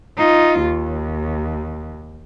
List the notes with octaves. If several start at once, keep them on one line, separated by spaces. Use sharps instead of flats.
D#4 F4
D#2